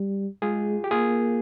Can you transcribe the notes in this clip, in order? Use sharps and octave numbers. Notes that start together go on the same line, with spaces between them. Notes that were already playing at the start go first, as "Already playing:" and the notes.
Already playing: G3
G#3 F4 G#4
G4
A#3 F4 G#4